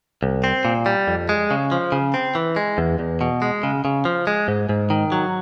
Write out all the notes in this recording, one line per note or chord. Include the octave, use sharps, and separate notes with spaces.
C2
C4
A#2
G3
F2
G#3
C#3
F3
C#3
C4
E3
G#3
E2
E2
B2
G#3
C#3
C#3
F3
G#3
G#2
G#2
D#3
F#3